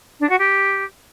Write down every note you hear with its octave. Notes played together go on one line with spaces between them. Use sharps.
D4
F#4
G4